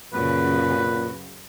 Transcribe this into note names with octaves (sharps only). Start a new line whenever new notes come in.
F#2 A#2 C#3 F#4 B4